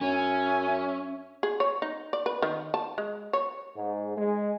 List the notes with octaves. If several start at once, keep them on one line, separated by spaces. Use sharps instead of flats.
F#2 C#4 E5 G#5
G#4
C#5
D#4
D5
B4
D#3
A5
G#3
C#5
G#2
G#3